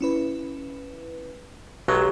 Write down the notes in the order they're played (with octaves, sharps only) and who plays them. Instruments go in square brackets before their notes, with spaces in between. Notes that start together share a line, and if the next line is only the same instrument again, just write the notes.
[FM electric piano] C#4 E4 B4
[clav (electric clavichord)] B1 F#3 G#3 [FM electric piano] G4 C6